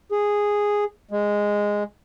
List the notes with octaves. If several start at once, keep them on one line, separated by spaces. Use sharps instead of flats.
G#4
G#3